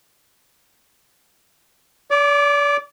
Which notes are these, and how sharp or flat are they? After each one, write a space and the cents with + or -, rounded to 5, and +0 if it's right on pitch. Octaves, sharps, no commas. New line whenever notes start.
D5 -40 D6 +0